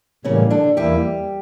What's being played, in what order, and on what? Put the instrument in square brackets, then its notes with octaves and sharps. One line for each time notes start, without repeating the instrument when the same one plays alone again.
[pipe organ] A2 E3 G3 A#3 [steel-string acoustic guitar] C#3 C#4
[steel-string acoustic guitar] D3 D4
[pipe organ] E2 E3 A#3 E4 [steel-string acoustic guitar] G3 G4